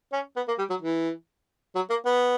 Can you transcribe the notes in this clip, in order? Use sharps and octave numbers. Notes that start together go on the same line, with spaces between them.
C#4
B3
A#3
G3
F#3
E3
F#3
A#3
B3